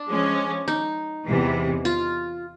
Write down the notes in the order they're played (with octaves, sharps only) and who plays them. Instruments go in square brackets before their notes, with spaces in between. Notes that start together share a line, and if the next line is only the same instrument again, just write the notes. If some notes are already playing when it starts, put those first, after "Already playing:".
Already playing: [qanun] D4
[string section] F3 G#3 C#4
[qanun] D#4
[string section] E2 C3 E3
[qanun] F4